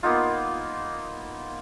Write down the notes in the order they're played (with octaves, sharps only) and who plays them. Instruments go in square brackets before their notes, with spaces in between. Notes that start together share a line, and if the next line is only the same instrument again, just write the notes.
[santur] A#3 B3 D#4 F4